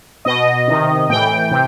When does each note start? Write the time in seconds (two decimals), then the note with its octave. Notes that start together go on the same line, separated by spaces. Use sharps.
0.25 B2 D#5
0.68 C3 D#3
1.09 A2 E3 G5
1.51 C3